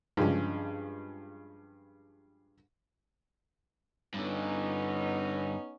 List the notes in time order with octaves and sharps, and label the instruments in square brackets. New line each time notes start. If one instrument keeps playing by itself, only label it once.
[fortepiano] G2 F3 G#3 C#4
[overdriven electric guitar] G2 D3 [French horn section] B3 C#4 D#4